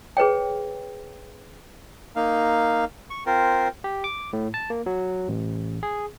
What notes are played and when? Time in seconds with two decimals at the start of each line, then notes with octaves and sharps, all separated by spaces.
0.17 G#4 B4 C#5 G5
2.16 A#3 D#4 F5
3.10 C#6
3.26 C4 F4 A#4 C5
3.84 G4
4.04 D6
4.33 A2
4.54 A5
4.70 A#3
4.86 F#3
5.28 A1
5.83 G#4